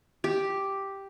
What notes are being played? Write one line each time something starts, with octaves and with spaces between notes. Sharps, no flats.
G4